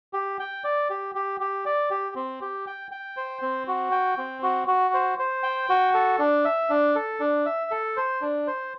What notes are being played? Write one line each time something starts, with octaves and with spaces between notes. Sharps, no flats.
G4
G5
D5
G4
G4
G4
D5
G4
C4
G4
G5
G5
C5
C4
F#4
G5
C4
F#4
F#4
C5
C5
G5
F#4
A4
D4
E5
D4
A4
D4
E5
A4
C5
D4
C5